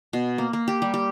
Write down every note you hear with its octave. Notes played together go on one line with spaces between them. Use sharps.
B2
A#3
A#3
G4
G3
G4